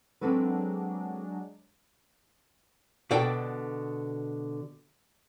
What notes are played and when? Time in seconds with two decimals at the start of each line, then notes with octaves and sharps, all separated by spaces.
0.21 F#3 G#3 C4 D4 A4 B4
3.11 B2 D3 A4 D5 G5